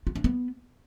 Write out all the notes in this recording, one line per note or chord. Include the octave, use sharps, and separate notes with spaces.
F4
D4
B3